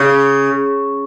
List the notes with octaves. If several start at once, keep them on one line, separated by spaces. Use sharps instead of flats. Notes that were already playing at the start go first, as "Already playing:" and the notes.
Already playing: C#3